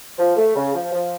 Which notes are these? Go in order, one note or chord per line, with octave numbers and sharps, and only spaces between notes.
F3
A3
C#3
F3
F3